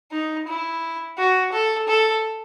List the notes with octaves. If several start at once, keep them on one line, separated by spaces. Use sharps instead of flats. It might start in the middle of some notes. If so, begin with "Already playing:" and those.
D#4
E4
F#4
A4
A4